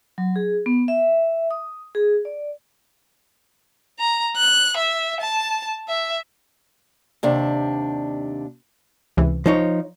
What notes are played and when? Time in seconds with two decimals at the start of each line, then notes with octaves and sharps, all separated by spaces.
0.18 F#3
0.36 G#4
0.66 B3
0.88 E5
1.51 D#6
1.95 G#4
2.25 D5
4.00 A#5
4.37 F#6
4.77 E5
5.21 A5
5.89 E5
7.23 D#2 C3 D4
9.17 C#2 C3 E3
9.46 F3 D#4 C#5